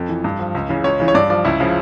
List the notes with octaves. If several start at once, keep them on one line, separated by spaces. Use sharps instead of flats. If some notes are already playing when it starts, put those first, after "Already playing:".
Already playing: F2 A4
E3
G2
F3
C#2
C#3 E3
C#2 C#5
C#3 E3
C#5
G2 D5
F3 D5
C#2 E4
C#3 F3